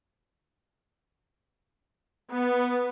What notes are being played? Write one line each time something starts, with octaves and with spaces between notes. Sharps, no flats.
B3